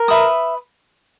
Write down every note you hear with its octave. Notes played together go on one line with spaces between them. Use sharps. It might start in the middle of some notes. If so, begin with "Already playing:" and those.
Already playing: A#4
B4 E5 B5 D#6